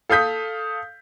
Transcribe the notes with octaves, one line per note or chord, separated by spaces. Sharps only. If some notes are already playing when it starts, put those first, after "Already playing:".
A4 F5 D#6 G6 B6